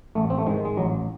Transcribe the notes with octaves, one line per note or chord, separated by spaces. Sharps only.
A1 A3
C4
A3
G#2 D#3 G#3
G#3
A1 F#3